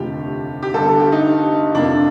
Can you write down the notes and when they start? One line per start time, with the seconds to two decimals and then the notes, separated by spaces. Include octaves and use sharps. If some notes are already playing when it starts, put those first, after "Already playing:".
Already playing: F1 D#2 D3 F3 A3 G4
0.63 G4
0.74 G1 G2 D3 A4
0.86 A4
1.00 G4
1.12 D#4
1.74 F1 F2 C3 F3 A#3 D4